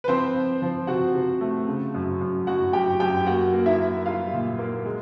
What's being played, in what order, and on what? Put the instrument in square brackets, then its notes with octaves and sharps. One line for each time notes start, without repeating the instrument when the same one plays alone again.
[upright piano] B4
F3 C4 C5
F3
F3
C3 F#4 F#5
C3
A3
C#3
F#2
F#2
F#2 F#4 F#5
F#2 G4 G5
F#2 G4 G5
A#3 F#4 F#5
A#3
E4 E5
A#3
G3 F4 F5
A#2
A#3
G#3